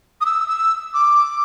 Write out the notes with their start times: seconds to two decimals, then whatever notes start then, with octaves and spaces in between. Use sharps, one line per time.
0.21 D#6
0.25 E6
0.48 E6
0.94 D6